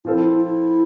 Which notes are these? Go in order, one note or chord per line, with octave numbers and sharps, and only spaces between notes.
F3 C4 E4 F4 A4 C5
E4